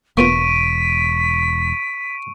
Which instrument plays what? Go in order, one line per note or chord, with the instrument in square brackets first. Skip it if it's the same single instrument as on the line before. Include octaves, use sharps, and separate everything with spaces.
[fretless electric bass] E1 [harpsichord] A#3 B3 F4 [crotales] C#6 D7 D#7 [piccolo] B6